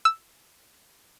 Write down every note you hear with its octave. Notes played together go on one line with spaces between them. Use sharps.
E6